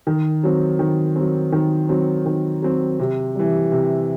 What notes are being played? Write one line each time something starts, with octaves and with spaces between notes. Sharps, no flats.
D#3
F#3 C4
D#3
F#3 C4
D#3
F#3 C4
D#3
F#3 C4
C3
E3 G3
C3